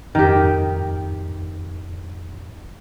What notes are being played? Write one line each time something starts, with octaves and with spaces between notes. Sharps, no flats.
F2 G#2 D#3 G4